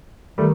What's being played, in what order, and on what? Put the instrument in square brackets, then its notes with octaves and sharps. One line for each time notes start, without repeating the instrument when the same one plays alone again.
[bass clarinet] D#3 [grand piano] G3 A3